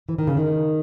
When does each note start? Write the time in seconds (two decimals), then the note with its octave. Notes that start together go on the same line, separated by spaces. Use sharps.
0.09 E3
0.18 D#3
0.27 C#3
0.37 D#3